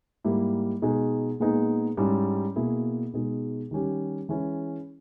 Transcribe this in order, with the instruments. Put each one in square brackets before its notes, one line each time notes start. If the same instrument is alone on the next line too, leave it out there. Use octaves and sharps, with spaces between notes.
[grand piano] G#2 G3 A#3 E4
B2 G#3 D#4 G#4
A#2 G#3 B3 D#4 G#4
G#2 G3 C#4 E4
B2 A#3 E4 G#4
B2 G#3 D#4 G#4
D#3 G3 C#4 G4
E3 G#3 C#4 E4